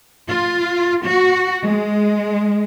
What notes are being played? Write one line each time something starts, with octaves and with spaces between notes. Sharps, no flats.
F4
F#4
G#3